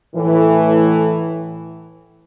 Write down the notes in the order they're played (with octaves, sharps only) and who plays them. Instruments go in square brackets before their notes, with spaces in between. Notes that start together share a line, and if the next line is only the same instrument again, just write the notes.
[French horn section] A2 E3